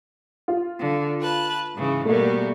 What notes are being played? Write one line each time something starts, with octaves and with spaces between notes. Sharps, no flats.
F4
D3
B4 A5 F#6
G#2 C#3 E3
B2 G3 A3 A#3